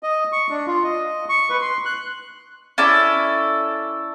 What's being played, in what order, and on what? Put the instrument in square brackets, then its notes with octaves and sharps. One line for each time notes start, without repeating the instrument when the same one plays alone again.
[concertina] D#5
C#6
D4
F4
D#5
C#6
B4
C6
F#6
[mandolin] C#4 E4 A4 D5